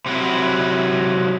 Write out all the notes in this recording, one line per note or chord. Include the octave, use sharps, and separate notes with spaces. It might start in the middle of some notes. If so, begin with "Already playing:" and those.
C3 F#3 E4